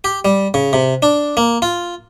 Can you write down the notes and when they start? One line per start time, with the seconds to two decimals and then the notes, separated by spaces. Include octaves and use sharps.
0.04 G4
0.25 G3
0.54 C#3
0.73 C3
1.02 D4
1.37 A#3
1.62 F4